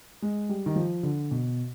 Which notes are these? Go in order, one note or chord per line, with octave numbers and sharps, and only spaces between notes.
G#3
G3
D#3
F3
D3
B2